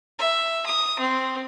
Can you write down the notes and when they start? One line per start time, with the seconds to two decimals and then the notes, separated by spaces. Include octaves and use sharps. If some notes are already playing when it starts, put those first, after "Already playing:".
0.19 E5
0.66 D#6
1.00 C4